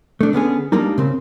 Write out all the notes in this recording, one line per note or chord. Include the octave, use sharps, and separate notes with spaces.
A3 D4
D3 B3 C#4 G#4
G3 G#3 A#3 D4 D#4
C#3 C4